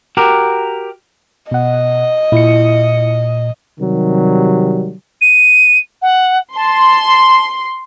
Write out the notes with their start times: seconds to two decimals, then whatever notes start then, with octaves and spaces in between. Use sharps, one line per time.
0.17 F#4 G4 A#4
1.51 B2 D#5 F#5
2.32 A#2 E4 C#7
3.79 C3 D#3 F#3 G3
5.21 D#7
6.02 F#5
6.56 A5 C6